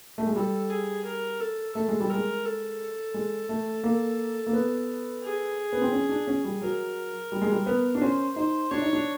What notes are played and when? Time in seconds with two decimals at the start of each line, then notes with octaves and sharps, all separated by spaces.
0.18 A3
0.26 G#3
0.36 G3 A4
0.70 G#4
1.05 A#4
1.40 A4
1.75 A3 A4
1.88 G#3
2.00 G3
2.10 G#3 A#4
2.45 A4
3.14 G#3
3.49 A3
3.84 A#3
4.47 A#3
4.53 B3
5.23 G#4
5.72 B3
5.82 C4
5.93 C#4
6.09 D4
6.28 C#4
6.44 G3
6.61 F#3 A#4
7.32 G3
7.42 G#3
7.52 G3
7.66 B3
7.95 D4
8.01 C#4 C5
8.36 D#4 C5
8.70 D4 C#5
8.82 D#4
8.93 D4